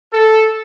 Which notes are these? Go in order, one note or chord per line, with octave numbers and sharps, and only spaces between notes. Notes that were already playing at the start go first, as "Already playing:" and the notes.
A4